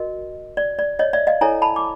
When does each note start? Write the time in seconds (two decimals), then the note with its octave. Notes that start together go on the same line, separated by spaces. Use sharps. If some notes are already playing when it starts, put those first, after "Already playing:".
Already playing: F#4 A#4 D#5
0.57 D5
0.79 D5
0.99 C#5 D#5
1.13 D5 E5
1.27 D#5 F5
1.41 E4 A4 C#5 G#5 A#5
1.62 A5 B5
1.76 D6